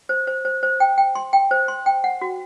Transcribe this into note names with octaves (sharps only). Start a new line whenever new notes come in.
C5
C5
C5
C5
G5
G5
C6
G5
C5
C6
G5
F#5
F#4